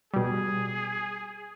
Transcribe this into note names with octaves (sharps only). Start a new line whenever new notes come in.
B2 G3 G#4